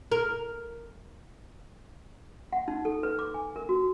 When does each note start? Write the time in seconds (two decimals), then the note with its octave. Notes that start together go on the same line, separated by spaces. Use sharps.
0.12 A#4
2.53 F#5
2.68 D#4
2.85 A4
3.03 B4
3.19 D6
3.34 G#5
3.56 A#4
3.69 F#4